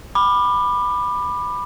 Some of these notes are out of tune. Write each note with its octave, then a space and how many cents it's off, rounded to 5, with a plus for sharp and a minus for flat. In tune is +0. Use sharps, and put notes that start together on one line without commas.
B5 +0 D6 +25